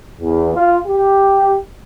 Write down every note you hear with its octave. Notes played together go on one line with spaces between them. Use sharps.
E2
F4
G4